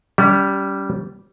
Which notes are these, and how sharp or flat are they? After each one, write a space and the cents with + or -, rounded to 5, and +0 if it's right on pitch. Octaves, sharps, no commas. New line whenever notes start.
G3 -10 C#4 +30